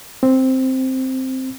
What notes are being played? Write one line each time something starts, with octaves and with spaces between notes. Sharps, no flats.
C4